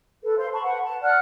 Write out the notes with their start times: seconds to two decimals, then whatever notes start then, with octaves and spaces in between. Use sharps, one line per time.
0.24 A4 B4
0.37 C5 F5 C6
0.52 A5 B5 C#6
0.64 B4 F#5
0.84 A5
1.02 D5 F#5 F6 F#6